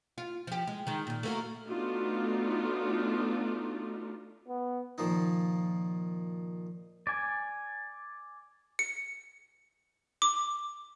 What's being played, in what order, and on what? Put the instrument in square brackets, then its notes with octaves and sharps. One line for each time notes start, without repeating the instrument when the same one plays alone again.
[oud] F4
F3 G4
G#3
D#3 G#3
A#2 D#3
A3 A#3 F#4
[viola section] A3 B3 D4 D#4 F4 F#4
[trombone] B3
[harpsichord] A#2 D#3 F3 D#4
[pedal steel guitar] D5 G#5
[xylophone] C#7
D6